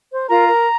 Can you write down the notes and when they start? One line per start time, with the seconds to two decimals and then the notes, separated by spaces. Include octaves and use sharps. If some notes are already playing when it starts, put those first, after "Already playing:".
0.10 C5
0.29 F4 A#4 A#5
0.48 A#4